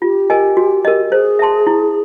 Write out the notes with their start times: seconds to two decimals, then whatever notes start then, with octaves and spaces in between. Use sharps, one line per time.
0.02 F4 G4
0.30 A#4 D#5 G#5
0.57 F#4
0.85 A#4 D#5
1.11 G#4 C5
1.39 E5 A5 C6
1.67 E4